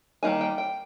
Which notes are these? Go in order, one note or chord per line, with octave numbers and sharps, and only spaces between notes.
D#3 G3 A#3 D#4 G#5
G5
G5